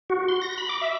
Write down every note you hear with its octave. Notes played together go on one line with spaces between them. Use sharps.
F#4
C6
A#6
B5
D6
E5